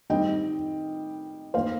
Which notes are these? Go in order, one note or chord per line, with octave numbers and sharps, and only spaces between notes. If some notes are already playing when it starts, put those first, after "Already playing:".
D#3 G3 C4 D#5 G5
D#3 A#3 C5 F5